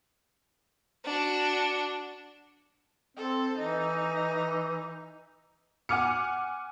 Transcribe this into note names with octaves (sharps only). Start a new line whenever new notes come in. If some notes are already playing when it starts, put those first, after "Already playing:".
D4 F#4
C4 A4
E3 D#4
F#5 G#5 D6 F6 C#7